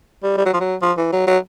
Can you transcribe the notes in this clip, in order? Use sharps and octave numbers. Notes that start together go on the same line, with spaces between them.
G3
G3
F#3
F3
F#3
F3
E3
F#3
F#3